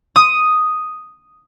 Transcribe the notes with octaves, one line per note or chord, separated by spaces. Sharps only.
D#6